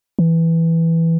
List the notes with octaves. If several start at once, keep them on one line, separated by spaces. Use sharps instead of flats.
E3